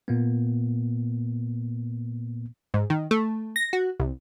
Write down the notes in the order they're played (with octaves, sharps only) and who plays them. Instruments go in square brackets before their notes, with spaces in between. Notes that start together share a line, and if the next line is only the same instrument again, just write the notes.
[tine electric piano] A#2 A#3 B3
[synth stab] G#2
D#3
A3
A#6
F#4
C2